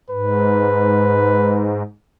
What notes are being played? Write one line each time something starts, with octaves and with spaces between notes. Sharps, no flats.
G#2 B4